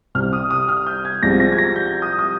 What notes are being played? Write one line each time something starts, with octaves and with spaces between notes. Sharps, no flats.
C2 C3 G3 F6
D#6
D#6
F6
G6
G#6
C2 C3 F3 G#3 A#6
A#6
G#6
A#6
G6
D#6
D#6